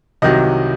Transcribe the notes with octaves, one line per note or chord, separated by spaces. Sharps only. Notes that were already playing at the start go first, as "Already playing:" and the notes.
C2 C3 D#3 F#3 D#5